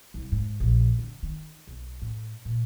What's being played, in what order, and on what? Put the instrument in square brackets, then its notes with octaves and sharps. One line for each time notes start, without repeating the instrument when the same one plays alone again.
[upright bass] C2
G#2
A#1
D3
D#3
B1
A2
A#2